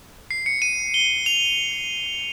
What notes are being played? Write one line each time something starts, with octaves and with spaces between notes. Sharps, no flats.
C7
C#7
D#7
G7
F7